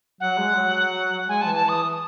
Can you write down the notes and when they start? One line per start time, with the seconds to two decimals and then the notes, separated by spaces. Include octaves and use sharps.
0.20 F#3 F#5
0.38 G#3
0.56 F#3
1.28 G#3 G#5
1.41 A5
1.47 E3
1.55 A5
1.64 E3 D#6